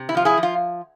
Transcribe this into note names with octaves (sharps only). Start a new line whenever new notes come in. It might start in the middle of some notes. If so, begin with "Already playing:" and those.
Already playing: C3
E4
F3 F4
E4 G#4
F3
F4